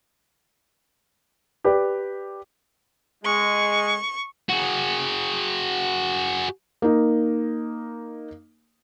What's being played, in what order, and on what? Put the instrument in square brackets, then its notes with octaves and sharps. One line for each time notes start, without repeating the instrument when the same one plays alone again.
[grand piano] G4 B4 D5
[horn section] G#3 [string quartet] C#6
[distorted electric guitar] F#4 G#4
[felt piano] A#3 D#4